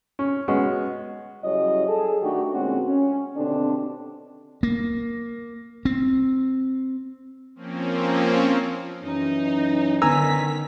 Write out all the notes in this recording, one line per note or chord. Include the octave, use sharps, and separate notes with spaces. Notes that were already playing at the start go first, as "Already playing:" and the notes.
C#4
G#3 B3 C#4 F#4
F#2 C#3 G3 E4 C#5 D#5
G#4 A4
D#3 A3 D4 F#4 G4
D2 A#2 G#3 C4 C#4 F#4
C#4
D#2 B2 D3 C4 D4
A#3
C4
F3 A#3 C4 C#4
F#2 E3 C#4 D#4
D3 D#3 B3 G#5 A#5 E6 B6